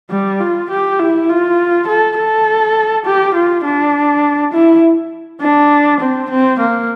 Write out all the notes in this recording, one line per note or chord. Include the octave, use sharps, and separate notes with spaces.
G3
F4
G4
E4
F4
A4
A4
G4
F4
D4
E4
D4
C4
C4
A#3